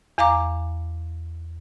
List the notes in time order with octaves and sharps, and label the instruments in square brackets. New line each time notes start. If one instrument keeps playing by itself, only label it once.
[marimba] E2 F5 A#5 D6